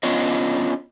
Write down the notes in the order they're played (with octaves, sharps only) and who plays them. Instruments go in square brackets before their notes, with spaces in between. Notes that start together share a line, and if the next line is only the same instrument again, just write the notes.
[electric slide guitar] B3 C#4 D4 F4 C#5 D#5